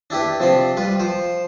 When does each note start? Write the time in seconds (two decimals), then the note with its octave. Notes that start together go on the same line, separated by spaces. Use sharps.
0.10 D4 E4 G4 B4
0.40 C3 F3 D4 B5 C6
0.77 G3 F4 B4
1.00 F3 C5